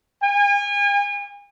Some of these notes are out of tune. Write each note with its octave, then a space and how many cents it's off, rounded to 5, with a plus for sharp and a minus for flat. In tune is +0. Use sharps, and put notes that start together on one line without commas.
G#5 -35